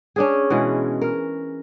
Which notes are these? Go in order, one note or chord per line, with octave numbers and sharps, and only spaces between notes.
C#4 D4 G#4
B2 E3 G#3
A#4